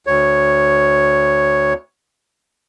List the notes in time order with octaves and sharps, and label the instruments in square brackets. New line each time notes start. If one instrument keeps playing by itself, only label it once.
[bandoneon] D2 C#5